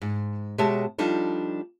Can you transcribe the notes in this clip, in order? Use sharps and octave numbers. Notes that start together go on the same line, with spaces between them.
G#2
B2 G#3 G4 C#5 E5 A5
F3 G3 D4 D#4 A4